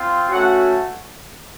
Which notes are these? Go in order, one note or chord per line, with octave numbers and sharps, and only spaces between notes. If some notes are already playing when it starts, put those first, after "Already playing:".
Already playing: C4 F4
A3 C#4 F#4 F#5